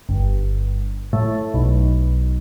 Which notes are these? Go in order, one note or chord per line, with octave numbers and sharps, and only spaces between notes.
G1
A2
B1